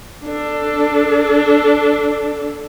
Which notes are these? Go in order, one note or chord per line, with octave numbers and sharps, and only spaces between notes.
D4 A4